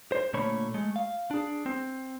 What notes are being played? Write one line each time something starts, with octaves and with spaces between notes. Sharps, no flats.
C5
A#2 D3 A3 A#3 C#5 B5
G#3 A3
F5
D4 G#4
C4